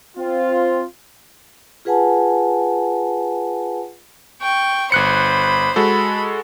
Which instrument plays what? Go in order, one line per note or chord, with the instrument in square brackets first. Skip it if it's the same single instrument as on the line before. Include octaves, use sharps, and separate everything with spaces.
[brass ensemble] C4 F4
[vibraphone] F4 G#4 B4 F#5 G#5 A5
[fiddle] G5 C#6
[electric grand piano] G1 F#6 C#7 [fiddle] C5 B5
[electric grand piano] G#3 F#4 A4 [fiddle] B5